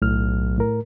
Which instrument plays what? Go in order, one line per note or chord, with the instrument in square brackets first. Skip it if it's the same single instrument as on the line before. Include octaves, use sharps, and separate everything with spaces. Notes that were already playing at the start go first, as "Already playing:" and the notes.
[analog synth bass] B1 [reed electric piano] A2 F6
[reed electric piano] A2 A#4